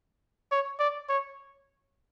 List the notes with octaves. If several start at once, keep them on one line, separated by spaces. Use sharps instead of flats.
C#5
D5
C#5